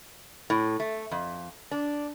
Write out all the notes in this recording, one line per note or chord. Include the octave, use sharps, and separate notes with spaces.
A2
A3
F2
D4